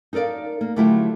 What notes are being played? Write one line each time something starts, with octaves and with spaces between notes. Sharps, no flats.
D#4 A4 A#4 D5 F5
A#3
D3 F#3 A3 E4 F4 G4